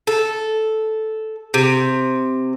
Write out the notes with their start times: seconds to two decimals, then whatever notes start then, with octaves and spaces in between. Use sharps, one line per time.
0.07 A4
1.54 C3